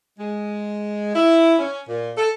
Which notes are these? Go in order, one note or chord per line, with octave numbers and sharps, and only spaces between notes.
G#3
E4
C#4
A#2
A4